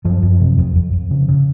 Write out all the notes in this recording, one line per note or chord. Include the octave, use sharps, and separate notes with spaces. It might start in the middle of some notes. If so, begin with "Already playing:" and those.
F#2 F3
F#2
C3
F2
F2
F2
C#3
C#3